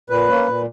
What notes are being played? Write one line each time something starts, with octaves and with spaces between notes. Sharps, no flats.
A#2 B4
A#3 C#4
A#2